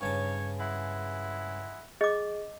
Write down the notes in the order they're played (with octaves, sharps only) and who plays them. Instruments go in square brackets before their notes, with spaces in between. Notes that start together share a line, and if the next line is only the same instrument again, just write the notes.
[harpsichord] G2 C#3 A5 [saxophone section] D#4 C#5
[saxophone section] G#3 E4 F#5
[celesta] G#4 [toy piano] D#5 D6